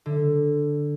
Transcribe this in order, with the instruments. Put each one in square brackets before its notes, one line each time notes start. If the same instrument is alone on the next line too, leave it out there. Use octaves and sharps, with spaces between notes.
[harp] D3